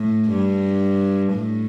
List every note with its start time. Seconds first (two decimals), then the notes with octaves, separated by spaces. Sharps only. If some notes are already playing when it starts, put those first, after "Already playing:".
Already playing: A2
0.29 G2
1.33 A2